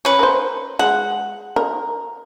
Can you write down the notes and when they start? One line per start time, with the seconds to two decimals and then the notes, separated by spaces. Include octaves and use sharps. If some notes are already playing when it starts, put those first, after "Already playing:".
0.05 C#4 B4
0.19 A#4 C5
0.79 G#3 F#5
1.56 A#4